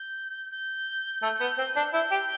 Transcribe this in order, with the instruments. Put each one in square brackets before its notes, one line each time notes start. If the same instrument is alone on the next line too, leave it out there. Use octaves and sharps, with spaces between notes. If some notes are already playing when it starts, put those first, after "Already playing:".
Already playing: [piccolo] G6
G6
[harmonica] A3
B3
C4
D4
[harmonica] E4 [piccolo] G6
[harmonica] G4